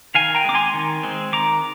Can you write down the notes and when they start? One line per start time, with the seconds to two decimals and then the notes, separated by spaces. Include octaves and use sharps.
0.15 D#3 F5 G#5
0.35 G5 A#5
0.44 G#3 C4 D6
0.55 G#5 C6
0.74 D#3
1.03 G#3 C4
1.33 D#3 A#5 D6